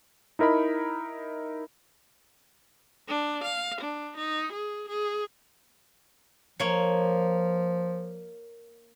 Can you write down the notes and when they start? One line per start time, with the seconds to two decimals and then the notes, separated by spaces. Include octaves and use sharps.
0.39 D#4 E4 A#4 D#5 B5
3.08 D4
3.44 F5
3.81 D4
4.17 D#4
4.52 G#4
4.89 G#4
6.60 F3 A#3 C#5